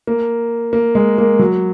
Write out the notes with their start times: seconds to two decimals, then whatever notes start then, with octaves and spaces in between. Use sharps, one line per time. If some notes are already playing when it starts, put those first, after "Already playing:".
0.07 A#3
0.73 A#3
0.95 G#3
1.18 A#3
1.39 F#3